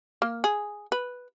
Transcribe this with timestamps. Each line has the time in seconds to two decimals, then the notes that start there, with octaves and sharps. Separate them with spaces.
0.22 A#3
0.44 G#4
0.92 B4